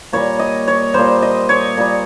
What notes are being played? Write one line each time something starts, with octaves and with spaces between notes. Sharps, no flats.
A#2 G3 C#5
D#5
C#5
A#2 G3 C5
D#5
C#5
A#2 G3